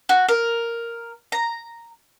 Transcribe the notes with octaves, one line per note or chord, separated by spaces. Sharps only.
F#4
A#4
A#5